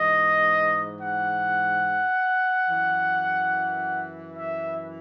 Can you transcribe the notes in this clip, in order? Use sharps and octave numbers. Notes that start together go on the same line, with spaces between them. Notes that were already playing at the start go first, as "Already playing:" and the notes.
Already playing: G#2 E3 D#5
F#5
F#2 E3
E5